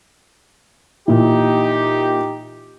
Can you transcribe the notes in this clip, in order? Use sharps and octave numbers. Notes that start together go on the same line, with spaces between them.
A#2 E3 D#4 G4